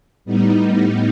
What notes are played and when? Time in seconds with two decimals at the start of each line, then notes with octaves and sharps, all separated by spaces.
0.25 A2 G3 B3 D#4